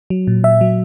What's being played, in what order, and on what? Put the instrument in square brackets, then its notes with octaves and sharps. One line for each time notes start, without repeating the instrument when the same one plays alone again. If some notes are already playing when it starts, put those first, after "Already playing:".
[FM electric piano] F#3
A#2
A#2 E5
F#3